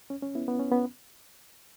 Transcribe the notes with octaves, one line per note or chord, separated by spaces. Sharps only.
C#4
C#4
B3 E4
B3
C#4
B3